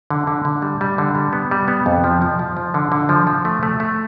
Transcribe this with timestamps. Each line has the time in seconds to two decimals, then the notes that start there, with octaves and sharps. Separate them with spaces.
0.10 D3
0.27 D3
0.45 D3
0.62 G3
0.81 G3
0.98 D3
1.15 G3
1.33 B3
1.51 G3
1.68 B3
1.86 F2
2.04 F3
2.22 F3
2.39 F3
2.57 F3
2.74 D3
2.92 D3
3.09 F3
3.27 F3
3.45 A3
3.63 A3
3.80 A3